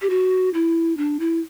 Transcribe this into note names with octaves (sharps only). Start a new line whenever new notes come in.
G4
F#4
E4
D4
E4